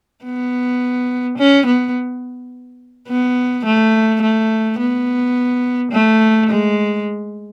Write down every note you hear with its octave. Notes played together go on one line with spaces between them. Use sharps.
B3
C#4
B3
B3
A3
A3
B3
A3
G#3